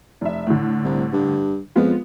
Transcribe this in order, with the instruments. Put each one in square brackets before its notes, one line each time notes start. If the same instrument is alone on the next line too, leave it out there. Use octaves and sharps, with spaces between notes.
[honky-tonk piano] F1 E5
A2 D3
[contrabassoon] C2
G2
[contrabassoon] F2 [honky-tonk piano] G#3 B3 F4